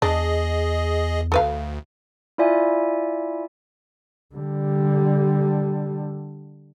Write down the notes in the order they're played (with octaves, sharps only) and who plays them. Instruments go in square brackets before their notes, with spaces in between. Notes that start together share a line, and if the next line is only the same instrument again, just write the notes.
[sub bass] E2 [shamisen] D4 [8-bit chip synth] G#4 D#5
[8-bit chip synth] D2 [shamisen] A4 B4 F5
[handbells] E4 F4 D5 E5 G#5
[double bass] D3 G3